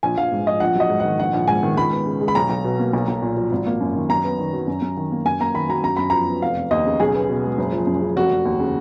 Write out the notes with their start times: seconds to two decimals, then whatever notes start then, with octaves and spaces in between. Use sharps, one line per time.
0.03 A#1 G#5
0.17 A#1 F5
0.32 G#2
0.47 F3 D#5
0.60 A#1 F#5
0.75 F#3 D#5
0.90 G#2
1.00 D#3 F#5
1.19 A#1 F#5
1.33 A#1
1.48 G#2 G#5
1.63 D#3
1.77 C#2 B5
1.92 B3
2.06 C#3
2.21 G#3
2.28 B5
2.35 B1 A#5
2.49 B1
2.64 B2
2.79 A#3
2.93 B1
3.08 B1
3.22 A#2
3.37 F3
3.51 G#1
3.67 A#3
3.81 F#2
3.95 D#3
4.09 F#2 A#5
4.24 B3
4.39 D#3
4.53 F#3
4.67 F#2
4.82 F#2
4.97 D#3
5.12 A#3
5.25 F#2 G#5
5.40 A#3 A#5
5.54 D#3 B5
5.69 F#3 A#5
5.83 F#2 A#5
5.97 F#2 B5
6.10 F3 A#5
6.28 B3
6.42 F1 F5
6.56 F1
6.71 D#2 D#5
6.86 C#3
7.00 B1 G#4
7.14 B3
7.29 B2
7.43 G#3
7.58 F#1
7.72 F3
7.87 F#2
8.02 C#3
8.16 F1 F#4
8.31 F1
8.45 D#2
8.60 C#3